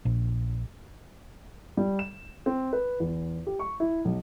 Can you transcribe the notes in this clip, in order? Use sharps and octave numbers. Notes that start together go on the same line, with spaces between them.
A#1
G3
E7
C4
B4
E2
G4
C#6
E4
B1